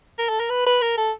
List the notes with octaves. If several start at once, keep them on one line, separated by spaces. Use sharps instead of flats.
A#4
A4
A#4
B4
B4
A#4
A4